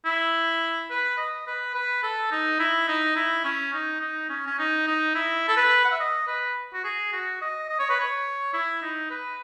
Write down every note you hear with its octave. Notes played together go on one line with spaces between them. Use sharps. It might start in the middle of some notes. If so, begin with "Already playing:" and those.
E4
B4
D#5
B4
B4
A4
D#4
E4
D#4
E4
C#4
D#4
D#4
C#4
C#4
D#4
D#4
E4
A4
B4
F#5
E5
D#5
B4
F#4
G#4
F#4
D#5
D#5
C#5
B4
C#5
E4
D#4
B4